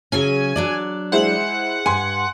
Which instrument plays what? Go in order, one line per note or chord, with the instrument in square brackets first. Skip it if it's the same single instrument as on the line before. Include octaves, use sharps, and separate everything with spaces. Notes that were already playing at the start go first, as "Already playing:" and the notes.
[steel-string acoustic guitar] C#3 F#3 C#4 [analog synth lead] G#5
[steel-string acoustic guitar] F#3 D4 D5
[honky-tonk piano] G#3 E4 C5 [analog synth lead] F#5
[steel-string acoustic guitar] G2 [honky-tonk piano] G#5 C6